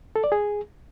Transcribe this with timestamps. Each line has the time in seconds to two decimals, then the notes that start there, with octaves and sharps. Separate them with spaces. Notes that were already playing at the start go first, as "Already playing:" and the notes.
0.16 A4
0.24 D5
0.32 G#4